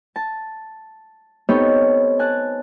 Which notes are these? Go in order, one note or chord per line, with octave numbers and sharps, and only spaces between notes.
A5
B3 C4 D#4 G4 A4 C#5
G#5 A5 F#6